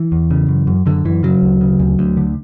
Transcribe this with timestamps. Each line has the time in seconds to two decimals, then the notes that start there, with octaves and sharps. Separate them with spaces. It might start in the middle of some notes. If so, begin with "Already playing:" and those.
Already playing: E3
0.12 E2
0.31 C#3
0.48 F#2
0.67 F#2
0.86 F#2 D3
1.05 F#2 E3
1.23 C#3 F#3
1.42 D2
1.61 C#3
1.79 D2
1.99 D2
2.17 D3